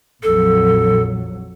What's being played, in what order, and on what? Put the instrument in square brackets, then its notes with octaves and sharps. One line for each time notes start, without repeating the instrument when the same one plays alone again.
[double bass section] A#1 F2 F#3 [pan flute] A4